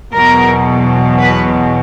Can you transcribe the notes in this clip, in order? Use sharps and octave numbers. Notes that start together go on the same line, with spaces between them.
E2 B2 F#3 A#4
B4